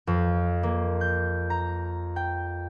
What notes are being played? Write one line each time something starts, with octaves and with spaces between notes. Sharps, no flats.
F2
A#3
G6
A#5
G5